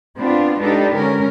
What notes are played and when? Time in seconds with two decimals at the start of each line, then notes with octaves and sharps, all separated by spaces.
0.18 B3 C4 D4 F4 B4
0.60 G#3 D4 D#4 G4 A4 B4
0.94 D3 G#3 C#4 A#4